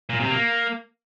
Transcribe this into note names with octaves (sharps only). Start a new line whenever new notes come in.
A#2
C3
A#3